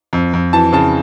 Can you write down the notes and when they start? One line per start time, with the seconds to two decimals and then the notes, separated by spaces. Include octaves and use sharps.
0.13 F2
0.33 F2
0.53 E3 A5
0.73 C#3 A5